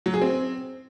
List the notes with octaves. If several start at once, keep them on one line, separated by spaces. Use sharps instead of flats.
F#3
G#4
C4